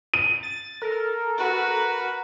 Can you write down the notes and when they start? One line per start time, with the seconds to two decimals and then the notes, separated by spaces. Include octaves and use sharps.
0.14 D#7
0.43 A6
0.82 A4 A#4
1.38 F#4 B4